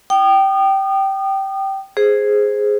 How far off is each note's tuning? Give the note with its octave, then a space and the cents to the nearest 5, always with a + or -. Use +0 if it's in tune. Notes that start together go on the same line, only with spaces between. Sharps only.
G5 -15 D#6 -35
G#4 +0 C5 +0